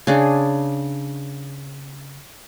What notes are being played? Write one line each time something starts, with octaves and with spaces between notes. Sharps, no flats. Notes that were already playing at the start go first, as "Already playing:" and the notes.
C#3 D4 G#4